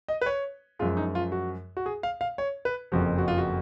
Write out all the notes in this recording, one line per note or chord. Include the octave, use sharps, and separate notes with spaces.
D#5
B4
C#5
F#2 F3 G#3 F4
D#4
F4
F#4
F#4
G#4
F5
F5
C#5
B4
F#1 F2 F3 F#4
F#4
F4
F#4